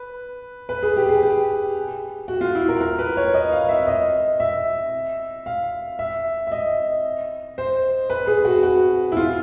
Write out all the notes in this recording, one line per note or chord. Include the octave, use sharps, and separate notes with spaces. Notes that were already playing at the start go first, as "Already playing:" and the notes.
Already playing: B4
B4
G#4
G4
G#4
G4
F#4
F4
E4
A#4
A#4
B4
C#5
D#5
F5
E5
D#5
E5
F5
E5
E5
D#5
C5
B4
G#4
F#4
F#4
E4
F4